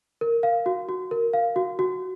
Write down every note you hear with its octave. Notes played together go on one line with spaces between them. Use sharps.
A#4
F5
F#4
F#4
A#4
F5
F#4
F#4